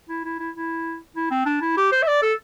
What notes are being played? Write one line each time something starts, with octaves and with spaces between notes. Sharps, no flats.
E4
E4
E4
E4
E4
C4
D4
E4
G4
C5
E5
D5
A4